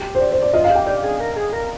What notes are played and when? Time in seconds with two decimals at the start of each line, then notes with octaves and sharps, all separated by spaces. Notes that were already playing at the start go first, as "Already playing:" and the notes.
Already playing: G4
0.15 C5
0.20 D5
0.32 C5
0.42 D5
0.53 F4 D#5
0.64 F5
0.70 G4
0.75 G5
0.86 G4 D5
1.03 G#4
1.20 A#4
1.36 G#4
1.53 A#4